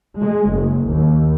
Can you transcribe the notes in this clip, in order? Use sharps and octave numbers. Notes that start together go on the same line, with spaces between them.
G#3
F#1
D#2